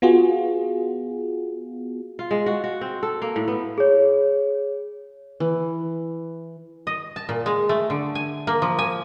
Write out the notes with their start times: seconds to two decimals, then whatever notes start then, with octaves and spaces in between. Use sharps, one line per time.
0.02 B3 F4 F#4 G#4
2.19 F4
2.31 G#3
2.46 F#4
2.64 F#4
2.81 C4
3.03 A4
3.22 A#3
3.36 A2
3.48 B3
3.78 G#4 C#5
5.40 E3
6.87 D#5
7.16 A5
7.29 A#2
7.46 G#3
7.69 A3
7.90 D3
8.15 G#5
8.47 A#3
8.62 F3
8.79 G#5